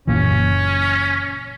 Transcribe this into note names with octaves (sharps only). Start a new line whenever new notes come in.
F#1 A#2 E3 C#4